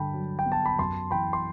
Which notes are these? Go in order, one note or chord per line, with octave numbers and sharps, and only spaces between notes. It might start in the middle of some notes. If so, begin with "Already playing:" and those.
Already playing: G2 D3 G5 A5 B5
F#3
G5
B3
A5
B5
F#2 A5 C6
E3 G5 B5
C6